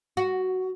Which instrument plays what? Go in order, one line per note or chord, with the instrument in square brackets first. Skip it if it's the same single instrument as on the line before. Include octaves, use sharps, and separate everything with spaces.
[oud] F#4